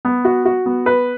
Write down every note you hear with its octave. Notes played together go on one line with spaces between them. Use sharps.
B3
F#4
F#4
B3
B4